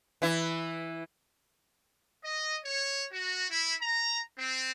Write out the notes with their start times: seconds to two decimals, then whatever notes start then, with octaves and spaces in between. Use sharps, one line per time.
0.22 E3 E4
2.24 D#5
2.64 C#5
3.11 F#4
3.50 E4
3.82 A#5
4.38 C4